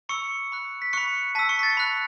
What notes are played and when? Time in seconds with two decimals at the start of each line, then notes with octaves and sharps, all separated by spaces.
0.09 B5 C#6 E6 C#7
0.52 B5 F#6
0.82 B6
0.93 B5 C#6 F#6 C#7
1.35 A5 E6 B6
1.49 C#6 C#7
1.59 B6
1.63 A6
1.77 B5 F#6